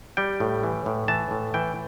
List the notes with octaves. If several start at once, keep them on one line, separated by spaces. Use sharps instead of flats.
G3 G5
A2
E3
A2
E3 A5
A2
E3 G5